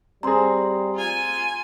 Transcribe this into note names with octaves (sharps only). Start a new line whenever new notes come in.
G3 C4 G#4 A#5 C6
F4 G#5